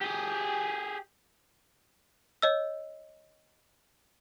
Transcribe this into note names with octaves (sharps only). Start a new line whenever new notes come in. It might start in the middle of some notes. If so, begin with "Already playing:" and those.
G4 G#4
C#5 D#5 E6